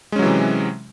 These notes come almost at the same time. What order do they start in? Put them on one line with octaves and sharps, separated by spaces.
G#3 C#4 F#3 E3 C3